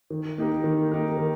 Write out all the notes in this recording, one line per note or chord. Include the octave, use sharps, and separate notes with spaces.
D#3
A#3 D#4 G4 A#4
D#3
A#3 D#4 G4 A#4
D#3